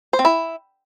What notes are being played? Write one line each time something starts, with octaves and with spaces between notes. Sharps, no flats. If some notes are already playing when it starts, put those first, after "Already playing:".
C5
C4
E4